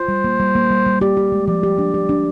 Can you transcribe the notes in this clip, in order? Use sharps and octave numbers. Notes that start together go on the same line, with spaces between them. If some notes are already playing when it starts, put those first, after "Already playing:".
Already playing: F4 C5
G3
A#3
G3
A#3
G3
G3
G4 D5
G4
G#3
F3 D5
G4
D4
G4
D4